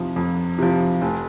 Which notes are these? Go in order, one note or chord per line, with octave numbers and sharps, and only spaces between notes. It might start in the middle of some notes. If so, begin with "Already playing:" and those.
Already playing: F2 C3 F3
F2
C3 F3
F1